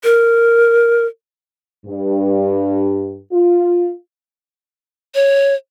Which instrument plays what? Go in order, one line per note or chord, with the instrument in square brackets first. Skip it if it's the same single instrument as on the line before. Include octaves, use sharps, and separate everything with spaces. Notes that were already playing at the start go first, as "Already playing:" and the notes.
[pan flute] A#4
[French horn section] G2
F4
[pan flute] C#5